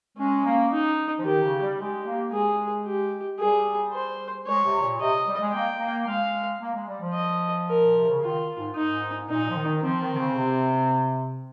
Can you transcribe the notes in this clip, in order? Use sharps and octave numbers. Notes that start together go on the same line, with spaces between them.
G#3 C#4
A#3
D#4
F3
D#3 G4
C#3
G3
G#3 G4
A#3
G#3 G#4
G4
G3 G#4
C5
G#3 C#5
C3
A#2
C3 D#5
G3
G#3
A#3 G5
A#3
G#3 F5
A#3
G#3
G3
F3
D#5
A#4
A#2
C3
C#3
D#3 F4
G#2
D#4
G#2
A#2 D#4
F3
D#3
F3 C4
D#3
D#3
C#3
C3